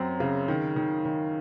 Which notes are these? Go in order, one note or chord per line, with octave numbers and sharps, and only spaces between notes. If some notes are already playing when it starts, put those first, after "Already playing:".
Already playing: F#2 F#3 C4 A#5
C#3
D#3
D#3
D#3